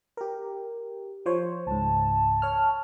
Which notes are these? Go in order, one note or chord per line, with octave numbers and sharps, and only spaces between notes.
G4 A#4
F3 C5 C#5
C#2 G#2 A5
C#5 F6